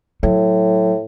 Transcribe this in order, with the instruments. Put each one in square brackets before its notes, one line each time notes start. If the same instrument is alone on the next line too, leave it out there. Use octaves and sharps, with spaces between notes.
[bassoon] A2 [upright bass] F#3